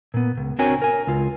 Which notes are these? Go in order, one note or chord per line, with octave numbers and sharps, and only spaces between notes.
A#2 B3
C#2
C4 D4 F#4 A#4 C#5 G#5
A#4 G#5
C#2 F4